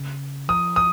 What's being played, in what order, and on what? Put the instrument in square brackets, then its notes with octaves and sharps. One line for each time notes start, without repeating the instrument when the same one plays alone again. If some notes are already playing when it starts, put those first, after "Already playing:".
Already playing: [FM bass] C#3
[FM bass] F3 [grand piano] D#6
[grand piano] D#6